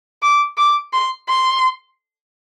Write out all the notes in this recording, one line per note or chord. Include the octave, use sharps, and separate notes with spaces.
D6
D6
C6
C6